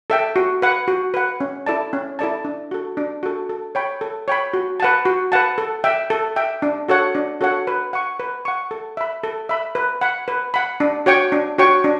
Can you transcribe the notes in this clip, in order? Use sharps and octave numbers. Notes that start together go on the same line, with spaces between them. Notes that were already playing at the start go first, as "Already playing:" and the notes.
A4 E5 G5
F#4
B4 F#5
F#4
B4 F#5
C#4
E4 A4 D5 A5
C#4
E4 A4 D5 A5
D4
F#4 A4
D4
F#4 A4
A4
C#5 G5 B5
A4
C#5 G5 B5
F#4
B4 F#5 A5
F#4
B4 F#5 A5
A4
E5 G5
A4
E5 G5
D4
F#4 A4 C#5 F#5
D4
F#4 A4 C#5 F#5
B4
F#5 C#6
B4
F#5 C#6
A4
E5 B5
A4
E5 B5
B4
F#5 B5
B4
F#5 B5
D4
F#4 C#5 G5 C#6
D4
F#4 C#5 G5 C#6
D4